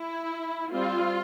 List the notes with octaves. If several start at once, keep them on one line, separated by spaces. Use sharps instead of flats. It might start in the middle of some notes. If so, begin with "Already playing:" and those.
Already playing: E4
G3 C4 F4